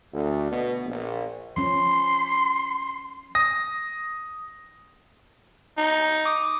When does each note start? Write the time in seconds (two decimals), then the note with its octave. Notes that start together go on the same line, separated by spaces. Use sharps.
0.13 D2
0.51 B2
0.86 A#1
1.57 F3 C#4 C6
3.35 D#6 A#6
5.78 D#4
6.25 D6 D#6